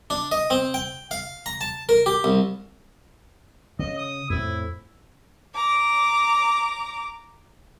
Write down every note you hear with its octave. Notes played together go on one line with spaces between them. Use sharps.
D4
D#5
C4
G5
F5
A#5
A5
A#4
G4
C2
C#3 D#5
D#6
F2 A2 E4
A#5 D6